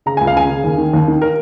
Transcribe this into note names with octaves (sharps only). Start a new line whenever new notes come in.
C#3 A#5
C#2 G#5
F5
C#3 G#5
C#3
D#2
D#3
D#2
D#3
A#4